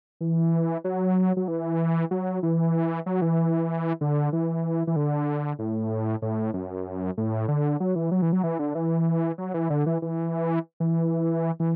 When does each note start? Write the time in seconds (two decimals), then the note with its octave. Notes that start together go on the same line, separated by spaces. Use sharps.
0.21 E3
0.84 F#3
1.37 F#3
1.48 E3
2.11 F#3
2.43 E3
3.06 F#3
3.22 E3
4.01 D3
4.33 E3
4.87 E3
4.96 D3
5.59 A2
6.22 A2
6.54 F#2
7.17 A2
7.48 D3
7.80 F#3
7.96 E3
8.11 F#3
8.22 E3
8.33 F#3
8.43 E3
8.59 D3
8.75 E3
9.38 F#3
9.54 E3
9.70 D3
9.86 E3
10.02 E3
10.80 E3
11.60 E3